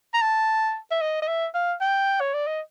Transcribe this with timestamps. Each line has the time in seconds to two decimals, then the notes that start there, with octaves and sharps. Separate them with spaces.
0.14 A#5
0.21 A5
0.91 E5
1.01 D#5
1.22 D#5
1.28 E5
1.54 F5
1.81 G5
2.20 C#5
2.33 D5
2.47 D#5